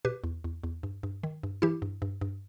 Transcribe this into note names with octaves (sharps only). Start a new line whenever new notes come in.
B2 G4 B4
E2
E2
E2
G2
G2
D#3
G2
E3 E4 G4
G2
G2
G2